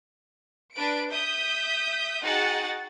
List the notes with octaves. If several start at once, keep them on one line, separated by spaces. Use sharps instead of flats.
D4 B4 D7
E5 D#6 G6 B6
D#4 F#4 G#4 F#5 G5 A6